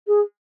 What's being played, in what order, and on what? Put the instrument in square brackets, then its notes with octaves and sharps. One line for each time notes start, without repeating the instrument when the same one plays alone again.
[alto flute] G#4